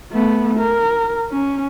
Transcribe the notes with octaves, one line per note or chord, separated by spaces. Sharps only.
A3 B3
A#4
C#4